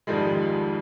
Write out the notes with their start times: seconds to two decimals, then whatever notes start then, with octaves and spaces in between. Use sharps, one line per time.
0.07 F2 G#2 D#3 F3 G3 G#3